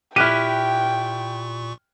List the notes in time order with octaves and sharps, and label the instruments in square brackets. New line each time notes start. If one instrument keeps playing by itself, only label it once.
[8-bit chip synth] A#2 C#6 [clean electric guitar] E4 G4 [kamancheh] G5 [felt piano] F6 F#6 D#7